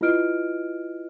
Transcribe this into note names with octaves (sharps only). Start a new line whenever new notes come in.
E4 F4 B4 D#5 F6 D7